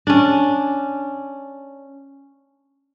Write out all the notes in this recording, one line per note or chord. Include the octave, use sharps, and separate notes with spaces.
C#4 D4